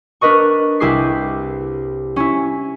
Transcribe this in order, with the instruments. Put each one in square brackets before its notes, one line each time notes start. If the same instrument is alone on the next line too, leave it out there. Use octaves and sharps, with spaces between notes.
[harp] D4 A#4 B4 D#5 C#6
C2 E4 G4 G#4 D6 C7
C#4 E4